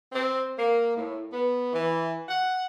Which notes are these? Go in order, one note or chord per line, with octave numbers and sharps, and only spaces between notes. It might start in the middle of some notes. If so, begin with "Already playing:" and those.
C4
A#3
A2
B3
E3
F#5